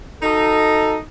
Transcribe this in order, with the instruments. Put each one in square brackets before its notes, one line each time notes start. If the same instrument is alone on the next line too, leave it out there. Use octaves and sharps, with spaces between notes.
[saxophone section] D#4 [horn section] F#4 A4